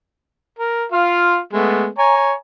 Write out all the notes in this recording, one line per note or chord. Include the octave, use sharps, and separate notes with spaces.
A#4
F4 F5
G#3 A3 B3
C#5 G#5 A#5